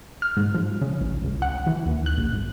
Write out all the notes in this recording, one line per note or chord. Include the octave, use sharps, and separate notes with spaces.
F6
G#2
F3
C#3
A1
C#2
F#5
E3
D#2
F#6
A#1
G#1